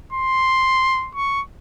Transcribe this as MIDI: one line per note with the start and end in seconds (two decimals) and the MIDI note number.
0.13 1.10 84
1.15 1.41 85